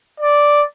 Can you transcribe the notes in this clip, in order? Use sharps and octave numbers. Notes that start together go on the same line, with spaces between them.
D5